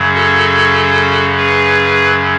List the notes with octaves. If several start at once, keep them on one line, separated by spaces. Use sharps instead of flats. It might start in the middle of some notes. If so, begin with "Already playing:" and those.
Already playing: F#2 C#3 F#3
F#4 A4
G#4 B4